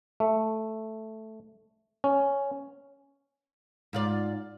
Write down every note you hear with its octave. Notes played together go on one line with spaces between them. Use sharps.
A3
C#4
G#2 F4 D5